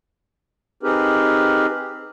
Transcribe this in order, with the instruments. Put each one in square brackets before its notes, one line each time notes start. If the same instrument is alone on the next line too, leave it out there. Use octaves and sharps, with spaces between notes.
[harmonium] C4 D#4 G4 G#4 A#4 B4